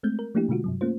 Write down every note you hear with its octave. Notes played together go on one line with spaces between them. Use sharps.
G#3 A3 C4 G6
A#4
F3 A3 A#3 D4 E4 G4
B2 D3 G#3 F4 F#4
G2 C3 F#3
A3 A#3 C#4 F4 C5